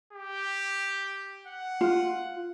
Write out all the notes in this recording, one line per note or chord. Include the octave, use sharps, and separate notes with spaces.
G4
F#5
F4